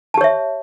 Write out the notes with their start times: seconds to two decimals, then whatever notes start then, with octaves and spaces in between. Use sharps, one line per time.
0.14 A5
0.17 G4
0.21 C#5
0.24 E5